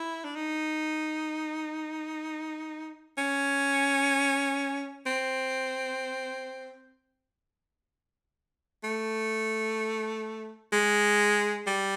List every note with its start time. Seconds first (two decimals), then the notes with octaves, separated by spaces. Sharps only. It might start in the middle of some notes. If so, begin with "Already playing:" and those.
Already playing: E4
0.25 D4
0.35 D#4
3.18 C#4
5.06 C4
8.84 A3
10.72 G#3
11.67 G3